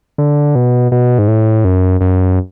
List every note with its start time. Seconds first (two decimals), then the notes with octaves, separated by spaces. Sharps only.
0.18 D3
0.55 B2
0.92 B2
1.19 G#2
1.28 A2
1.65 F#2
2.01 F#2